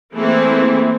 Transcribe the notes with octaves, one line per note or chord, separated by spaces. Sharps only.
E3 A3 A#3 C4 E4 G#4